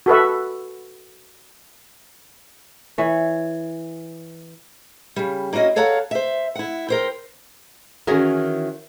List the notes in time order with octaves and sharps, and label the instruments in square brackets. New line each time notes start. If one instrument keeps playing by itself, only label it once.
[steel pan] F#4 A4 B4 E5
[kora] E3 C#5
[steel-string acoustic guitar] C#3 G3
A#3 C#4 E4 F#4 D#5
A4 C#5 F5 F#5 A#5
C5 E5
E4 F#5
A#4 C5 G5
[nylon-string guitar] D#3 E3 C#4 F#4 G#4 A#4